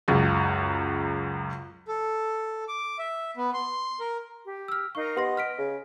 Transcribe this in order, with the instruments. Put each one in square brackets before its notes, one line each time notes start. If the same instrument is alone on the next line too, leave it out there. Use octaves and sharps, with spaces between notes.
[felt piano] C#2 F#2 G#3
[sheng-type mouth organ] A4
D6
E5
B3
C6
A#4
[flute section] G4
[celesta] E6 F6
[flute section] D#4 A#4 F5 [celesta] C#6
[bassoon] B3 [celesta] G4 C6 A#6 [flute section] D#5
[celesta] F6 B6 D7
[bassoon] C#3